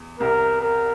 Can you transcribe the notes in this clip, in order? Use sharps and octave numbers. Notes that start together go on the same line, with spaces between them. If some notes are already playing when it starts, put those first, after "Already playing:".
Already playing: E2
C2 C3 A#4
A#4